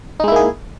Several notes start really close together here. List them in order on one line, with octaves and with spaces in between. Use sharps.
D#4 G#3 E4 A#3 G#4